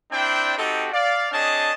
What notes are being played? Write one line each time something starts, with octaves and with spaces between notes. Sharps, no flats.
C4 D4 E4 C5 D5 G5
C4 D#4 F#4 G4 A4
D5 F5
C4 D4 G#4 C#5 D#5 A5